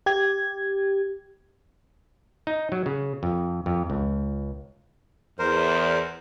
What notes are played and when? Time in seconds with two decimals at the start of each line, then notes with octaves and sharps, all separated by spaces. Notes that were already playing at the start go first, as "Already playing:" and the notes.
0.06 G4 G#6
2.47 D#4
2.72 F#3
2.86 C#3
3.23 F2
3.66 F2
3.90 C#2
5.39 E2 A#4 C5